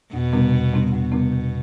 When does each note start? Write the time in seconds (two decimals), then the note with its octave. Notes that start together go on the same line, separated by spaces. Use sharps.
0.12 E2 B2
0.33 C3 G3 B3 D4
0.53 E2
0.73 C3 G3 B3 D4
0.92 E2 B2
1.12 C3 G3 B3 D4
1.32 E2